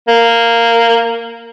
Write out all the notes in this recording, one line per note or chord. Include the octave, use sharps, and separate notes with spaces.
A#3